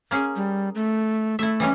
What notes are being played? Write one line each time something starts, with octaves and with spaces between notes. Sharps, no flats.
A#3 C#4 G#4
G3
A3
A3 E4 E5
E3 G3 C#4